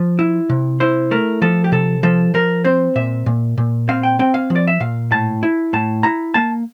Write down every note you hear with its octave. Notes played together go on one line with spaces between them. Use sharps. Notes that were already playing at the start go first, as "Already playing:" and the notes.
Already playing: F3
E4
C3
E4 C5
A3 A#4
F3 A4
G4
C3 A4
F3 A4
F3 A#4
C4 C5
A#2 E5
A#2
A#2
C4 F5
G5
C4 G5
F5
F3
D5
E5
A#2 F5
A2 A5
E4
A2 A5
E4 A#5
A#3 A5